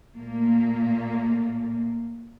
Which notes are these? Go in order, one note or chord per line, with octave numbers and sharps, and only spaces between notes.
A#2 A3 A#3